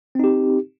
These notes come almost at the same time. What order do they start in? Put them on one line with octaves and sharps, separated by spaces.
C4 D#4 G4